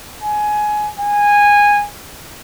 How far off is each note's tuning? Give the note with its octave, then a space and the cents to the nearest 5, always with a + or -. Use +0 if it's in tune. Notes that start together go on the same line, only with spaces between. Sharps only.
G#5 +15
G#5 -15